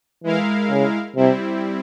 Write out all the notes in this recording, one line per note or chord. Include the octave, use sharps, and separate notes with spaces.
E3 G#3 E4 A#4 F5
C#3
C3 G3 C4 E4